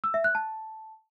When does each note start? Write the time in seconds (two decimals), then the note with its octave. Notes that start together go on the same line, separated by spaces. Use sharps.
0.04 E6
0.14 E5
0.24 F#6
0.35 A5